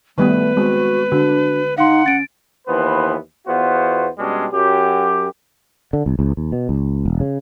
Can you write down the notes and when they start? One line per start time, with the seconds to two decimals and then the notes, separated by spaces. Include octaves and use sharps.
0.18 D#3 G3 A3 B3 B4
0.57 G#3 C4 F#4
1.12 D3 D4 F#4
1.78 D#4 F5 F#5 C6
2.06 C#4 A6 D7
2.68 D#2 E3 B3 B4 C5
3.47 E2 B3 F4 F#4 C5
4.18 B2 G3 G#3 C#4 D4
4.52 F#2 F#3 G4
5.93 D3
6.06 C2
6.19 C#2
6.37 D#2
6.52 B2
6.69 C#2
7.06 E1
7.20 C#3